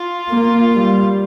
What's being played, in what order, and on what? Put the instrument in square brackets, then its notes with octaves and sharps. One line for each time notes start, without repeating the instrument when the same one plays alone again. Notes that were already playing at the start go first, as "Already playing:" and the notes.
Already playing: [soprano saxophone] F4
[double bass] A#3
G3